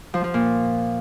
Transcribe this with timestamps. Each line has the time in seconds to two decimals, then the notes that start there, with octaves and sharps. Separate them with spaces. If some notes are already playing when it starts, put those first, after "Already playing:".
0.14 F3
0.24 F3
0.34 A#2